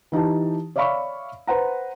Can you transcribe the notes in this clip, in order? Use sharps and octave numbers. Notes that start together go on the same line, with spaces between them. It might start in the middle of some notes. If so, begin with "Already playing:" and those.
E3 D#4 G4 A5
C#5 D5 E5 F5 B5 C#6
B4 C5 F#5 A#5